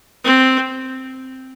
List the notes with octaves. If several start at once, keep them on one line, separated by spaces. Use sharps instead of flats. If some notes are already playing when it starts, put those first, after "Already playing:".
C4